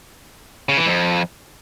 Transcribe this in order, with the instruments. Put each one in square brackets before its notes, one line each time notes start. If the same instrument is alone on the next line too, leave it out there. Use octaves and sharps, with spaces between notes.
[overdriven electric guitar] C#3
E3
F2